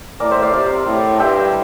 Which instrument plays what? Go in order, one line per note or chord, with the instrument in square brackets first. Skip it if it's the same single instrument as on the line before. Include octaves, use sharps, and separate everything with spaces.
[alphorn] A2 [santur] A#4 D5
[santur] C5 E5
D5 F5
[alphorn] C3 [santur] D5 F5
[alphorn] A2
[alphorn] G2 [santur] E5 G5